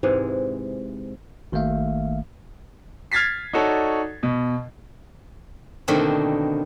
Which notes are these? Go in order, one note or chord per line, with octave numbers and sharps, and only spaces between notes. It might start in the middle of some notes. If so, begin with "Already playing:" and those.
G#2 C3 E3 G#3
G#1 D#3 A3 A#3 E5 F5
F6 G#6 A6 B6 C7
D#4 F#4 A4 C#5 D5
B2
B2 D3 D#3 A3 A#3 C4